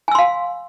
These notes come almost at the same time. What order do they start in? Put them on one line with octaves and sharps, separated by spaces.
G#5 E6 C6 F5